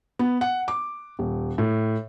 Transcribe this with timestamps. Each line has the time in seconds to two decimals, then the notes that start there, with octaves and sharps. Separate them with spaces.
0.19 B3
0.41 F#5
0.68 D6
1.19 D#1
1.58 A2